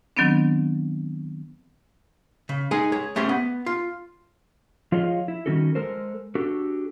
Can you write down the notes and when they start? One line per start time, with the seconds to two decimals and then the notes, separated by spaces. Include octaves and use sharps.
0.17 D#3 F#3 B3 C4 D4
2.49 C#3
2.71 G#3 D#4 G#4 G#5
2.92 G#4 C#5
3.16 A3 C#4 G4 G#4 C5
3.29 B3
3.66 F4
4.92 F3 F4 G#4 C#5 D#5 F5
5.28 E4
5.46 D#3 G3 C#4 F#4 A4
5.75 G#3 A4 A#4 C5
6.35 D4 F#4 G4 A4